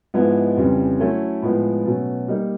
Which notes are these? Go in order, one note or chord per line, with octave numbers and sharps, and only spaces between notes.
G#2 F3 G#3 B3 E4
F2 C#3 E3 G3
F#3 A3 C#4 E4 A4
A2 F3 G#3 B3
B2 F#3 A3 C#4
G3 A#3 D#4